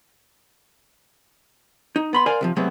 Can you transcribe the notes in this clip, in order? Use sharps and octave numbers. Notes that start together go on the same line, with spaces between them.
D#4
B3 B5 C6
A#4 C5 D5 F5 G#5
C3 E3 F3
C3 F#3 G#3 A3 B3 C4